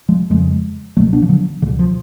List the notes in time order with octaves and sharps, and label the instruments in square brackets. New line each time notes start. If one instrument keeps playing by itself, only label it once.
[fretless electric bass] F3 G#3
F2 C#3 F3 G#3
C#2 B2 F#3 A3
B3 D4
F3
D3 F#3
C#2 B2 D3
F3